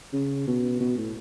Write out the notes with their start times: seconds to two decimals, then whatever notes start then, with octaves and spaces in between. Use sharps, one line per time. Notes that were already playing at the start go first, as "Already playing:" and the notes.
0.13 C#3
0.47 B2
0.80 B2
0.97 A2